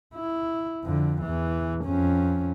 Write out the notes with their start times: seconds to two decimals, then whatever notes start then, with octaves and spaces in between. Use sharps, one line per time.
0.15 E4
0.84 F2 D3
1.22 E2 E3
1.85 F2 C#4